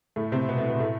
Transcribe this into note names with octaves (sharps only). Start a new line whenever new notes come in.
A2 A3
C3 C4
B2 B3
A2 A3
B2 B3
A2 A3